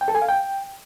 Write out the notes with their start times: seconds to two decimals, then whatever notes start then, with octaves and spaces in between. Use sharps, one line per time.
0.01 G5
0.08 A4
0.15 G#5
0.22 F5
0.28 G5